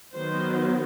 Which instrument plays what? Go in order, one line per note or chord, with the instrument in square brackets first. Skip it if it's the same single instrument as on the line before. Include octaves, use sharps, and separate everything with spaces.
[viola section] D#3 F#3 B3 C5